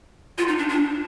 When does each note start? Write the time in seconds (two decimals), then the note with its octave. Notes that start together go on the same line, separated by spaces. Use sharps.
0.38 F4
0.48 D#4
0.58 D4
0.69 D4